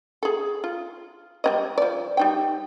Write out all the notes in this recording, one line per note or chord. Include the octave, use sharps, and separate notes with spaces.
G#4 A4
F4
G3 C#4 D#5
F3 D5
G3 D#4 G5